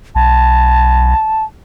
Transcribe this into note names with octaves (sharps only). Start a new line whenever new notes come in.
B1 A5